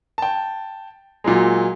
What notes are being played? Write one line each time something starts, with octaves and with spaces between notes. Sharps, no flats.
G5 A5
A#2 F#3 G#3